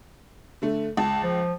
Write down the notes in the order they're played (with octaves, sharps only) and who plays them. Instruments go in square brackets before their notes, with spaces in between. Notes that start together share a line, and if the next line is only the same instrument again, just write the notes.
[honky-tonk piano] D3 A3
[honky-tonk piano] C#2 [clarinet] A5
[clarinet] F3